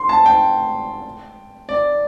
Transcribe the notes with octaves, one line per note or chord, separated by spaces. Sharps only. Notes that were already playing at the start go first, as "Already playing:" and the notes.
Already playing: C6
A5
G5
D5